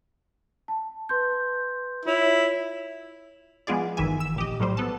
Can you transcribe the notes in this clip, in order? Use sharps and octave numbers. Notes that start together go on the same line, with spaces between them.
A5
B4 C6 G6
E4 F4 C#5 F7
F3 G#3 B3 F4 G#4 D5
G1 D#3 E3 E5 G#5
E6
A#1 G4 D#5
A2 F#3 G3 C5
B3 A4 A5